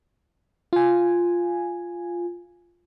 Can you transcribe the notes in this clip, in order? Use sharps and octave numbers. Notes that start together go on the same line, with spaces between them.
F4 G#5